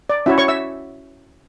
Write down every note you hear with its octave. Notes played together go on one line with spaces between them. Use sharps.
D5
C#4 E4 F#4 C#5 E5
C#5 C#6
E5 E6